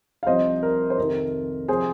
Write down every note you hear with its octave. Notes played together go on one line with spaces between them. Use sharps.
F5
C2 C3 F3 C5 D#5
A#4
C5
F2 C3 D#3 A#4
C3 F3 G#4 C5